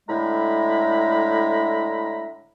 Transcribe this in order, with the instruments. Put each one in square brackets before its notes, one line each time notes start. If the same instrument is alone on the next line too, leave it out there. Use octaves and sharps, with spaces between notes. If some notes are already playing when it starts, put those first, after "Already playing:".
[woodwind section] A2 D3 G#3 E5 A#5 B5